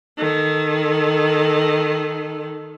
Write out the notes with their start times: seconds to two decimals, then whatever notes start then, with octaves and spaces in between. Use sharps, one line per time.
0.18 D#3 A4